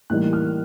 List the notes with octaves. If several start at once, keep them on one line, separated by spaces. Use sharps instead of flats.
A2 E3 G3 A#3 D#4 F#6
F6